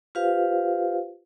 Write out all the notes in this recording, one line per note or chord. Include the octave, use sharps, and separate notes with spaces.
F4 G4 B4 C5 F5